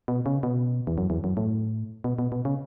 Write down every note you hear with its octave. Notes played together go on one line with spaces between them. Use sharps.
B2
C#3
B2
E2
F#2
E2
F#2
A2
B2
B2
B2
C#3